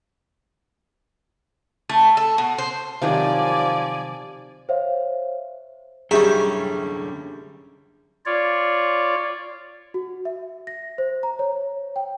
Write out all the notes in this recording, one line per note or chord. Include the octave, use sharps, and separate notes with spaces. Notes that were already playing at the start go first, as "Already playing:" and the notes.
A3
A4
B2
C5
C3 D#3 F3 F#3 D5 G#5
C5 C#5 E5 F5
F#2 D3 D#3 G3 C#4 G#4 E5
F4 C#5 D5
F#4
E5
A#6
C5
A#5
C#5
G5